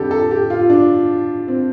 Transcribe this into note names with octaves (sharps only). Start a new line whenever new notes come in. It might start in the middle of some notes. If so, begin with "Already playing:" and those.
Already playing: F2 D3 G3 G4 A4
A4
G4
F4
D4
C4